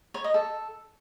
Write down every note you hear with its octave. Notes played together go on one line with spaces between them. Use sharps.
C#5
D#5
A4